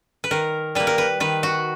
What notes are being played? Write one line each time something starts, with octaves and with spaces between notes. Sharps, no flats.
B4
D#3 A#4
G3 A#3 B4
A#4
B4
D#3 B4
F#4